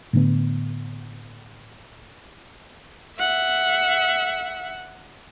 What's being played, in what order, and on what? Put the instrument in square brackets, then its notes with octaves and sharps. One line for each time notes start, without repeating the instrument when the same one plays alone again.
[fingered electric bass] A2 D3 B3
[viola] E5 F#5